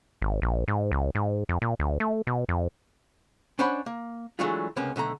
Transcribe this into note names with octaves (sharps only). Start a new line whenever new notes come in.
G#1
A#1
G#2
C#2
G#2
F2
A#2
D2
A3
B2
F2
C#4 D4 C5 C#5 F#5 B5
A#3
E3 F#3 G#3 A3 D4 F4
C#2 C3 A#3 B3 C#4
B1 D3 A3 A#5